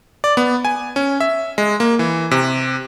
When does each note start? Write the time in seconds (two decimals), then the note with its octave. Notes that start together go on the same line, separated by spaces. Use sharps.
0.24 D5
0.37 B3
0.65 G#5
0.96 C#4
1.20 E5
1.58 G#3
1.80 A#3
1.99 E3
2.31 C3